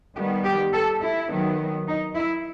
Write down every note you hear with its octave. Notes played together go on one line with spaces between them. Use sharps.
D#3 G3 B3 G4
G4
A4
E4
D#3 F#3 B3
D#4
E4